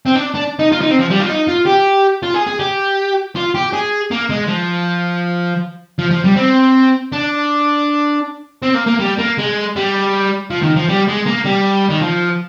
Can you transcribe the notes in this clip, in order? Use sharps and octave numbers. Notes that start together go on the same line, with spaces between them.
C4
D4
D4
D#4
F4
D#4
C4
F3
G3
F4
D#4
F4
G4
F4
G#4
G#4
G4
F4
G4
G#4
A#3
G#3
F3
F3
F3
G3
C4
D4
C4
A#3
A#3
G3
A#3
G#3
G3
F3
D#3
F3
G3
G#3
A#3
G3
D#3
F3